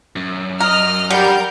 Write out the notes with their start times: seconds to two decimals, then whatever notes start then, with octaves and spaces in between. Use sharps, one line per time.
0.16 F#2
0.60 A#4 D#5 F6
1.10 D3 G3 A#4 G6